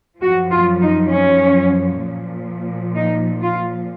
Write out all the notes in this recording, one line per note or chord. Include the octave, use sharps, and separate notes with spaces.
F#2 F3 F#4
F4
D#4
C#4
A#2 F3
D#4
F4